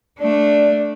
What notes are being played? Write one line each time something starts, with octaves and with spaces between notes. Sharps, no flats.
A3 D4 D5